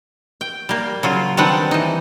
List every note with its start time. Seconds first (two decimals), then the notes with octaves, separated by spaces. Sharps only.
0.41 G5
0.69 G3 A#3
1.03 C#3 F#3 F4
1.37 D#3 G3 C4 D4 B4 F#5
1.71 E3 D#4